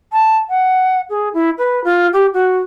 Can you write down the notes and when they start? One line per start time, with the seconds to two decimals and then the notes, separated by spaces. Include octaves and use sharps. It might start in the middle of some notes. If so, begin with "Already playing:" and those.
0.13 A5
0.49 F#5
1.10 G#4
1.34 E4
1.58 B4
1.84 F4
2.13 G4
2.34 F#4